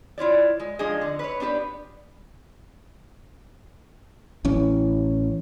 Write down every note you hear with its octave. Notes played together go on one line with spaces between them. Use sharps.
E4 F4 C#5 D5
G#3
F3 G#3 D4 D#4 G#4 D#5
D3
B4 C#5
B3 D4 G4 B4
A1 E3 C#4